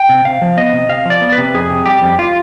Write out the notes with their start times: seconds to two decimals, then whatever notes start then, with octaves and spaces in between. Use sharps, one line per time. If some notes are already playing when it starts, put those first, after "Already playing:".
Already playing: G5
0.09 C3
0.25 C3 F5
0.42 F3
0.57 B3 D#5
0.73 C3
0.89 C3 F5
1.05 F3 D5
1.21 B3
1.32 B4
1.38 C3
1.54 F2 G#4
1.70 C3
1.86 G3 G4
2.02 F2
2.19 F4